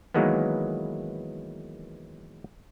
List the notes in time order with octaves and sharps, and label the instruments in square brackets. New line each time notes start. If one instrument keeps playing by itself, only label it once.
[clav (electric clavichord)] D#3 E3 F#3 G#3 A#3 B3